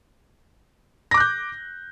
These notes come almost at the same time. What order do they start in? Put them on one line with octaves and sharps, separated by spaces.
A#6 D6 F#6 G6